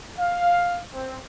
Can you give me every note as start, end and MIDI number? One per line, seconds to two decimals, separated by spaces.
0.19 0.81 77
0.94 1.16 60